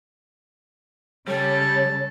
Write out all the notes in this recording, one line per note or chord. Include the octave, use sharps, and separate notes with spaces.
C#3 G3 A4 C#5 A5